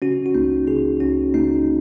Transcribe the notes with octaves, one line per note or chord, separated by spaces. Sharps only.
C#3 C#4 F#4
F#4
C#2 A#3 D#4
C#3 D#4 G#4
C#2 C#4 F#4
C#3 A#3 D#4